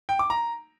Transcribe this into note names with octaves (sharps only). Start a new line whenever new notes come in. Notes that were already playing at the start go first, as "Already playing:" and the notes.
G5
D6
A#5